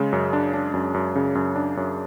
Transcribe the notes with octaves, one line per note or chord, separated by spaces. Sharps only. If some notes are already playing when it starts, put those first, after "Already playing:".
Already playing: C#3 G#3
F#2
D4
D4
F#2
F#2
C#3
F#2
D4
F#2